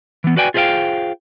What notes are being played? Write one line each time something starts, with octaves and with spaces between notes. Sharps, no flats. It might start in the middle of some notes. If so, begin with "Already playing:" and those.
E3 B3
F#4 B4 D5 G5 G#5
F4 G#4 C5 D#5 F5 G5